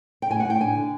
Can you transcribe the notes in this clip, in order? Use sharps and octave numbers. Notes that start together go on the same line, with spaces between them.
G5
A2 G#5
F#5
A2 G5
D4 G#5
D3